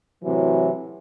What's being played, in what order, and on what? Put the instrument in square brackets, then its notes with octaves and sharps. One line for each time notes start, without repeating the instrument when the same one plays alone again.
[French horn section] A2 C3 E3 F#3